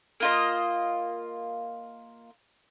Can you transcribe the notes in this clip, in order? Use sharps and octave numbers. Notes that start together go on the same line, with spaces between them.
A#3 F4 D#5